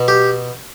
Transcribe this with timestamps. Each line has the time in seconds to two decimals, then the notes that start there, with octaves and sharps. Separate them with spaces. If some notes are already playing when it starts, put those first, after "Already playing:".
Already playing: B2
0.08 G4